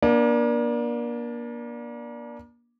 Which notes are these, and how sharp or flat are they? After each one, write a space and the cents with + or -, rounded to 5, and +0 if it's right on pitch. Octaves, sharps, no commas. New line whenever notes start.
A#3 +35 D4 +0